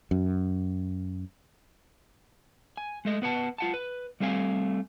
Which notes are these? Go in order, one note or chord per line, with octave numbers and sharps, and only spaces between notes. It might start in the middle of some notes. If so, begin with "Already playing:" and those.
F#2
G#5
G#3 A3 D#5
B3 B4 F#5 A5
F4 F#5 A5
B4
G3 A3 C4 F5 G#5